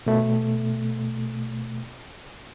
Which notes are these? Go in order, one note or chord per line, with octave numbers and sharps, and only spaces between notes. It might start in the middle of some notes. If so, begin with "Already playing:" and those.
B2 A3